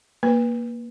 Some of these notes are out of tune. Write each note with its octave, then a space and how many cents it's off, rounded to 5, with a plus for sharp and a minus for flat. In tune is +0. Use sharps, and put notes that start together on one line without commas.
A#3 +10 B4 -15